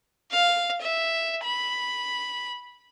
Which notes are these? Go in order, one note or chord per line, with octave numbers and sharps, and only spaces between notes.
F5
E5
B5